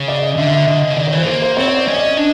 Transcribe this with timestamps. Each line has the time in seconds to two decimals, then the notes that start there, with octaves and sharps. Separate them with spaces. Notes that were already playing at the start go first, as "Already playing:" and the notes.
Already playing: C#3
0.08 D5
0.22 D#5
0.37 D3 E5
0.52 E5
0.67 D3 D#5
0.82 C#3
0.91 D3
0.97 D#3 D5
1.07 C#5
1.13 E3 C5
1.22 A3
1.27 A#3 C5
1.42 C5
1.57 C4 C#5
1.68 C#5
1.77 D5
1.87 C#4 D#5
1.96 D5
2.05 D#5
2.17 D4